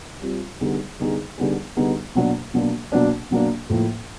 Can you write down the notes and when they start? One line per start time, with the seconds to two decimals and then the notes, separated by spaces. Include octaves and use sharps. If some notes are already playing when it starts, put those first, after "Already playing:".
0.22 G3 C4 F4
0.61 D3 G3 B3 D#4 G#4
0.99 D3 G3 B3 D#4 G#4
1.38 D3 G3 B3 D#4 G#4
1.77 D3 G3 B3 D#4 G#4
2.15 B2 F#3 A#3 D4
2.54 B2 F#3 A#3 D4
2.92 B2 F#3 A#3 D4
3.31 B2 F#3 A#3 D4
3.70 A2 F3 A#3